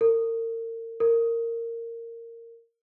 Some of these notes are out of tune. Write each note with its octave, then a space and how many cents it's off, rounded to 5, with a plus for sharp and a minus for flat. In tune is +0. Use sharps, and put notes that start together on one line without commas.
A#4 -35
A#4 -15